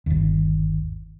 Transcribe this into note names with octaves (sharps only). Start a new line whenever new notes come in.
G1 D#2